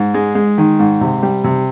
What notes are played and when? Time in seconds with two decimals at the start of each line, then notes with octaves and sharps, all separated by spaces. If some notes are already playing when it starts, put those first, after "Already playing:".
Already playing: G#2
0.14 G#3
0.35 G#3
0.58 D#3
0.79 G#2
1.01 C3
1.23 G3
1.44 C3